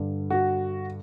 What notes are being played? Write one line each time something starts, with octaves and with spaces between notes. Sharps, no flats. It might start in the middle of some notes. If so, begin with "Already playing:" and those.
Already playing: G2 D3
F#4